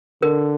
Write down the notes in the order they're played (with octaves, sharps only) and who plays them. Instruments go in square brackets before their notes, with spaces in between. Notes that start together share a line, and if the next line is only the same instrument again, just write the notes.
[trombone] D3 [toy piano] A#4